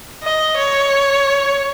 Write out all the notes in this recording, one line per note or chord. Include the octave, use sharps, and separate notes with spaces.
D#5
C#5